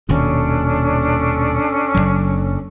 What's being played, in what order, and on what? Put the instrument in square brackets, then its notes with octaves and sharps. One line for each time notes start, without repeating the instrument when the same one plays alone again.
[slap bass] D#1 D#2 B2 [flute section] C#4 D4 A4
[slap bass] F#1 C#2 F#3